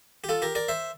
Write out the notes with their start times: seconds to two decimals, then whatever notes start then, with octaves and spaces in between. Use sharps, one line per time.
0.24 G4
0.29 F4 A4
0.42 G4 A#4
0.55 A#4 D5
0.68 C5 E5